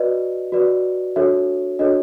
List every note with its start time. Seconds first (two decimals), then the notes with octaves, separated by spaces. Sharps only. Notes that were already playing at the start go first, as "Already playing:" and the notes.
Already playing: F#4 B4 D5 D#5
0.52 F#4 B4 D5
1.16 D4 F#4 A4 C#5 E5
1.79 D4 F#4 A4 C#5 D#5